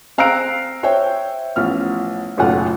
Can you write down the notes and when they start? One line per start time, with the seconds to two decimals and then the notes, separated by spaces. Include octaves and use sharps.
0.18 C4 F5 A#5 E6 F#6 D7
0.83 C5 C#5 E5 G5
1.56 A1 F3 B3 F6
2.37 F#1 B1 A2 F4 F#5